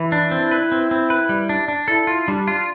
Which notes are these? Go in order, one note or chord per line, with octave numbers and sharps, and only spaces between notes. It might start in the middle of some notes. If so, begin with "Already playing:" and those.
Already playing: E3 E4
D4
C4
B4
C4
C4
B4
G3
D4
D4
E4 A4
F4
G3 D4
F4